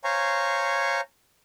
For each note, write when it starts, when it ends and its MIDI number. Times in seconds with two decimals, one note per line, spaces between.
0.04 1.01 72
0.04 1.01 73
0.04 1.01 77
0.04 1.01 80
0.04 1.01 82
0.04 1.01 85